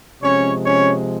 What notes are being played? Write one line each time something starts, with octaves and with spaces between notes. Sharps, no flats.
C3 F3 G#3 C#4 C#5
C#4 C#5